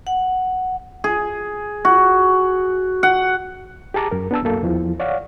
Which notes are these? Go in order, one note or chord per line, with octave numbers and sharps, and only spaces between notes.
F#5
G#4
F#4
F#5
G4 G#4 A5 A#5 D6
F#2 A#4
B3 D4 A5 E6
C2 F#2 F#3 A#3 A4
E2 E3 F3
C#5 D5 F5 F#5